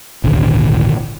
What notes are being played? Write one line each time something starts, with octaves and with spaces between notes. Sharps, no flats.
D#1 G#1 D2